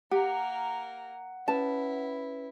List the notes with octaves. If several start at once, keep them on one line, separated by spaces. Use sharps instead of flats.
A#3 G4 A#4 F#5
C#4 E4 B4 A5